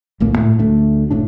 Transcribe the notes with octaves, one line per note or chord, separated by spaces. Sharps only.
D1 A#1 A2 A#3
A2 A3
D2 A3 D4
F#1 A2 D4